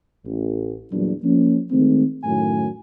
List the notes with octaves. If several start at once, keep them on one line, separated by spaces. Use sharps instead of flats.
A1
E2 A#2 F#3 G3 D4
F3 A#3 C#4
D#3 G#3 A3 C4
F#2 A2 D#3 A3 F#4 G#5